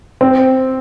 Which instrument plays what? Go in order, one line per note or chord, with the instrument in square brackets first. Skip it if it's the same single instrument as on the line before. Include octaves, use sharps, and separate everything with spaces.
[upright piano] C4